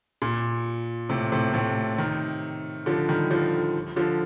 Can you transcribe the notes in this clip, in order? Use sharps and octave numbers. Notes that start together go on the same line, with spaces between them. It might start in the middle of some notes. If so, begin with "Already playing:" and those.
A#2
A2 C3
A2 C3
A2 C3
C3 D#3
D3 F3
D#3 G3
D3 F3
D3 F3